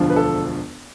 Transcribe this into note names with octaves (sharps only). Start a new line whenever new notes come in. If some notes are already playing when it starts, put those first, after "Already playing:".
Already playing: E1 D2 D3 F3
B4
A4